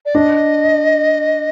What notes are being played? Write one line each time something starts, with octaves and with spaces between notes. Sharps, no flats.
D5
D4 D#5